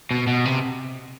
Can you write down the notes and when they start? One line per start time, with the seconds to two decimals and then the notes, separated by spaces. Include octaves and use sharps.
0.11 B2
0.27 B2
0.45 C3